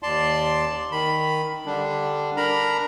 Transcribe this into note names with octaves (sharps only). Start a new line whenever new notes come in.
D#2 D5 A5 C6
D#3 B5
D3 G3 D4
D4 A#4 A#5 B5